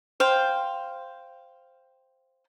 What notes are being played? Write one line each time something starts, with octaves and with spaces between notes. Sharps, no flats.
C5 F5 G5